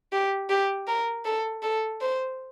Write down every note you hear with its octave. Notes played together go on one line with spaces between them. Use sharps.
G4
G4
A#4
A4
A4
C5